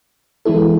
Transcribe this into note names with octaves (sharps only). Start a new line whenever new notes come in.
E3 G#3 B3 E4 A4